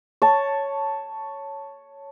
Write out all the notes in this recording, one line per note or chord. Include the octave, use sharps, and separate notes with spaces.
C#5 A5